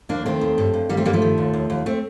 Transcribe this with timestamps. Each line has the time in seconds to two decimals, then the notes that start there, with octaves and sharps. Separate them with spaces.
0.09 D#2 A#3 D4
0.26 D#3 A3 C4
0.41 D#2
0.58 G2
0.73 G2
0.89 D#3 G3 A#3
0.97 A3 C4
1.05 G2 G3 A#3
1.13 F3 A3
1.22 D#3
1.38 D#2
1.53 D#2
1.70 D#2
1.86 A3 C4